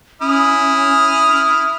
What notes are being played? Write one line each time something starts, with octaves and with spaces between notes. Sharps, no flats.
C#4 E4 D#6 F6